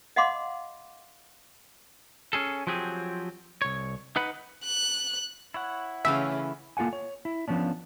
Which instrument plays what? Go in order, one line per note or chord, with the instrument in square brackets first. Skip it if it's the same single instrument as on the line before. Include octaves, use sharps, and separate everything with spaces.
[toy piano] D#5 F5 F#5 B5 C6 D6
[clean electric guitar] C#4 G#4 A4
F3 F#3 C4 G4 G#4
C2 C#5
D#4 B4 F#5 B5
[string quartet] F#6
[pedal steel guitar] E4 C#5 F#5
[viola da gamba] C#3 C#4 [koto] E3 A3 F5 [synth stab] E5
[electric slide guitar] A#3 F4 A4 F#5 G#5
C#5
E4
F3 B3 C#4 D4